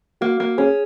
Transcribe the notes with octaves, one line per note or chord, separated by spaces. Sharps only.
A#3 F#4
A#3
C#4 G#4